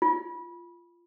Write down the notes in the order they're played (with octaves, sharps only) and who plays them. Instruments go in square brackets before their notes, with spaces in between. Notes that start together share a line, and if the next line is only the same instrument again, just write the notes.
[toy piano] F4